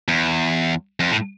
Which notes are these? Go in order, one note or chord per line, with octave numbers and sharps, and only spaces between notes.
E2
F2
A2